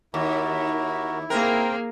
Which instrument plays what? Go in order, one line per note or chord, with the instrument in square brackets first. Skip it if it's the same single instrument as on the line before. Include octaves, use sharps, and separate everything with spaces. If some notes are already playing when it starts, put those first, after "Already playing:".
[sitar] D#2 [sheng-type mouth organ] E4 [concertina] F#4 A#4
[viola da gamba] A#3 G#4 [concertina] C4 G5 [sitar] A#4